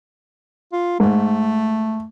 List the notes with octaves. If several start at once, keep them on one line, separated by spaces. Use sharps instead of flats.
F4
G#2 A3